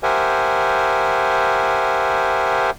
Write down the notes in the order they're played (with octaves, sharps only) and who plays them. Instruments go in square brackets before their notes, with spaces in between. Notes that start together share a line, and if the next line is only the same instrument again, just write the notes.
[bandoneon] G4 A#4 C5 E5 F#5 G#5